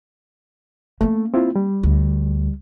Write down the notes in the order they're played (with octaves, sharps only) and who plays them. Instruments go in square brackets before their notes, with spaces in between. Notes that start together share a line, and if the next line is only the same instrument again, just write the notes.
[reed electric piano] A3 [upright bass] A#3 C#4
[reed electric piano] C4 E4 F4
G3
[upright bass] D2